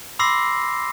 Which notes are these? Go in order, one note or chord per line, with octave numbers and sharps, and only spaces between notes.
B5 C6 D6 E6 A#6 C7